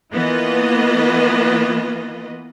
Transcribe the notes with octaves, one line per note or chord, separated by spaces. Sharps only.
E3 A#3 B3 F4 B4 D#5